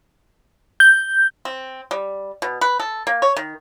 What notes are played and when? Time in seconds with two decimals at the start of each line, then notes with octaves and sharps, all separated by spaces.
0.80 G6
1.45 C4
1.91 G3
2.42 B2
2.61 B4
2.80 A4
3.07 A#3
3.22 C#5
3.37 D#3